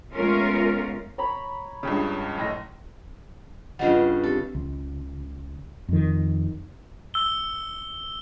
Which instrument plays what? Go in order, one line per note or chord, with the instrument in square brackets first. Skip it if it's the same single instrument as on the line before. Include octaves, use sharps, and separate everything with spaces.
[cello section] G#3 A3 B3 C#4 F4 A#4
[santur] C#5 A#5 B5
[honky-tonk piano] C#2 G2 C#3
F#1 A2 A#6
[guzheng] G2 C#3 G3 [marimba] F4 D#5 F#5
[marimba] C4 G4 [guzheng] A4
[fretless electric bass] C#2
F2 D#3
[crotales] E6 G7